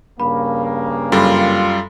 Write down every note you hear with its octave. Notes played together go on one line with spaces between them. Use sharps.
G2 C#3 A#3 B5
F#2 G3 F4 A4 B5